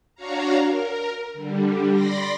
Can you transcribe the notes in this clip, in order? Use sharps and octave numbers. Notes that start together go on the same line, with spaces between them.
D4 F#4 C#5 F5 A#5
A#4
D3 G3
D5 B5 C6 A#6